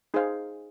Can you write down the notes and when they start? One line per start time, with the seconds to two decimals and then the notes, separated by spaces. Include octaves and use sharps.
0.14 D#4 G#4 C5 F5